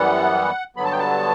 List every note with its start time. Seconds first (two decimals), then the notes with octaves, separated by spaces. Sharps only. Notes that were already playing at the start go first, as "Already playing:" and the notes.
Already playing: F#2 E3 G3 B3 F#5
0.76 G2 D3 F#3 B3 B5
0.85 A5
0.92 G5
0.99 A5